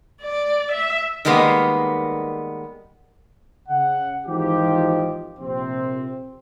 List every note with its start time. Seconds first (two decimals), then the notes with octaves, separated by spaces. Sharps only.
0.22 D5
0.72 E5
1.25 D#3 G3 G#3 A#3 B3
3.69 C#3 F#5
4.26 G#1 E3 F3 D#4 G4
5.40 A#1 C3 C4